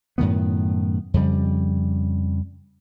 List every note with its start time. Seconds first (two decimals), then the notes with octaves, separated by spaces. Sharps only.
0.18 F#2 A2 D#3 B3
1.14 F2 C#3 G3